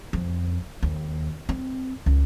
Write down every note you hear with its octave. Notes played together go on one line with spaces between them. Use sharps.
F2
D#2
C4
C#2